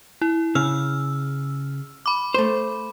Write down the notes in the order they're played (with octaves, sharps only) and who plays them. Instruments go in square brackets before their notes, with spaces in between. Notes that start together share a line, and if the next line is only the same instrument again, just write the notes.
[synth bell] E4
[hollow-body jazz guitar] C#3 [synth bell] E6 F6
[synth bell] B5 D6
[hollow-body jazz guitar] A3 C5